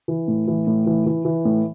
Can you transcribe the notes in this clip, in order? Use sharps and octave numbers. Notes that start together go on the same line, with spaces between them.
E3
A2
E3
A2
E3
E3
E3
A2